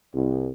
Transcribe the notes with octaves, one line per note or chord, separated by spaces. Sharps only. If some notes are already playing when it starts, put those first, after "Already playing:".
C2